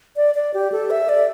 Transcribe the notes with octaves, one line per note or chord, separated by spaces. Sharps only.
D5
D5
G4
A4
E5
D5